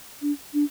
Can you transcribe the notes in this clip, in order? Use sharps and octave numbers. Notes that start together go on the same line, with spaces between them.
D4
D4